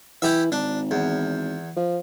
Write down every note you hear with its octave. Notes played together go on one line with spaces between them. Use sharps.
E3 E4 G4 E5
G#1 D4
E2
F3